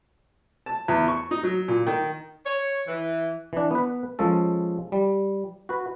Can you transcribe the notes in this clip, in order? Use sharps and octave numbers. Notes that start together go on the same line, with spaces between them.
A5
E2
C#6
D#4
F#3
A#2
D#3
C#5
E3
E3 D4
B3 B4
F3 G#3 C#4 A4
G3
F#4 B4